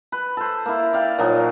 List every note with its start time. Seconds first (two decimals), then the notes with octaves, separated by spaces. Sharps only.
0.12 B4
0.37 A4 C5
0.66 A#3 E4
0.93 D5 F5 G5
1.18 A#2 F3 F#3 D#4